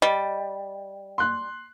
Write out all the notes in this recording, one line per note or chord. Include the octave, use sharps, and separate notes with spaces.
G3 D#5
C6 F#6